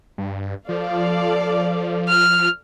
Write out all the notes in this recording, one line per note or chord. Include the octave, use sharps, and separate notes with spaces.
G2
F3 A4 D5 F5
F6